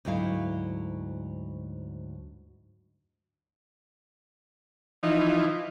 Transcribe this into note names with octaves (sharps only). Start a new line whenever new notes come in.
D2 G#2 F#3 E4 F5
E3 F3 D#4